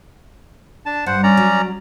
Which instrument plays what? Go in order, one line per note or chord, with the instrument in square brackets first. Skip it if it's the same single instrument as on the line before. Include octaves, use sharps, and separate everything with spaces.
[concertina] D4 A5
[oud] G2 [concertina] C5 F#5
[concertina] C#4 D5 A#5
[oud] F#3